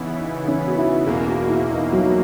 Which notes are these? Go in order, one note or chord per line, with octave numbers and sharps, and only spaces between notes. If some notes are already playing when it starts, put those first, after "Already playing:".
Already playing: C#3 E3 B3 D#4 E4
D#4
C#4
F#4
E4
E2 B2 A#3 G#4
F#4
E4
D#4
F#3